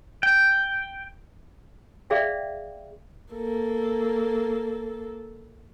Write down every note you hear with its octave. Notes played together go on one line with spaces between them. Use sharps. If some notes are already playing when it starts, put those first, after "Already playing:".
G5
G#4 D5 E5 F5 G5
A#3 A4